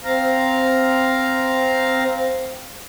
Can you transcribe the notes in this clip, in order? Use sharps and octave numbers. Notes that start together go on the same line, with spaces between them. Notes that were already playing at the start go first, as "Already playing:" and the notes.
C4 F5 A#5